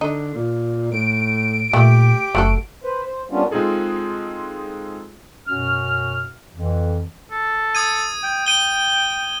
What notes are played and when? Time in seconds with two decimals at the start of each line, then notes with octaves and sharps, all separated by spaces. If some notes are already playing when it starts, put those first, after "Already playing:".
0.01 D3 D#4
0.34 A#2
0.92 A2 D7
1.73 A#2 A3 G4 G5
2.35 F#1 A3 F#4 A4
2.84 B4 C5
3.06 C5
3.31 G3 A#3 B3 C#4 D4 F4
3.51 G#3 C4 D#4 F4 G#4 A4
5.47 F#2 B2 C#4 F#4 F6
6.54 F2 E3
7.31 A4
7.75 D#6 G#6 D#7
8.23 G5
8.46 G5 D#7 G7